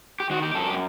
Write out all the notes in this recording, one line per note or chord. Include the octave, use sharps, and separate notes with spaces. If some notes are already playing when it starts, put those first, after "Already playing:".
G4
D#3 F#4
G4
F#2 A4
G4